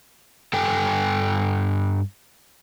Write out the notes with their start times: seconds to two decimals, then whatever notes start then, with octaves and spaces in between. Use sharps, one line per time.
0.53 G2 A4 G5 G#5